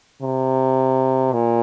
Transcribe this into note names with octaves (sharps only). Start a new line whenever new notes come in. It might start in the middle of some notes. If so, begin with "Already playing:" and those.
C3
A#2